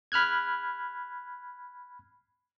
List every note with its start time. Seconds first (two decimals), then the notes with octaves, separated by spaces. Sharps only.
0.12 B5 F6 F#6 G#6